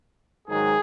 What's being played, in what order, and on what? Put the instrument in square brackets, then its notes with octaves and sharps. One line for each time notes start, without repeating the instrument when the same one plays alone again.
[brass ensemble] G#2 D#3 F#3 G#4